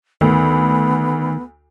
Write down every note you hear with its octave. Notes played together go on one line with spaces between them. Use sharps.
D2 D#3 B3